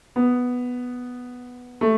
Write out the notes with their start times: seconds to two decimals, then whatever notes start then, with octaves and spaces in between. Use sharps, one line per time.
0.16 B3
1.81 A3